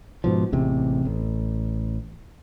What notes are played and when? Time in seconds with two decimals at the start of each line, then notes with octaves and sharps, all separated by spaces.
0.24 G#2 B2 F3
0.52 A1 E2 C3
1.05 A1